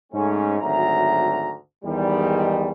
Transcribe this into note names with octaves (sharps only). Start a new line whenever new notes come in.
G#2 A3 C#4
G#1 D2 F#3 E5 A#5
E2 G#2 D#3 G3